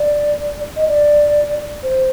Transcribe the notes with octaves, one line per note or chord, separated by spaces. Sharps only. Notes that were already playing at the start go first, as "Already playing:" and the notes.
Already playing: D5
D#5
D5
C5